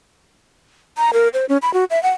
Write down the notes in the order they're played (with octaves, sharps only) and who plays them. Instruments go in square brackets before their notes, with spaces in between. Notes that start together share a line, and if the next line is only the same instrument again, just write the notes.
[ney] A#5
A#4
C5
C#4
B5
F#4
E5
F#5